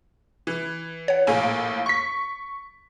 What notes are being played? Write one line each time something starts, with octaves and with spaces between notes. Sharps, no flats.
E3
C#5 F#5
A#1 A2 A#3 G#5
C#6 B6